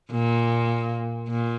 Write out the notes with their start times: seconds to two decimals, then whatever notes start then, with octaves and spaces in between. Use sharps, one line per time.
0.11 A#2
1.28 A#2